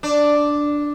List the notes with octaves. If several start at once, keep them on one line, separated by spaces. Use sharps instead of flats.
D4